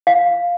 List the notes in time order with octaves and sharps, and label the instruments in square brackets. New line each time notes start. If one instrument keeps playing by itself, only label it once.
[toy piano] F5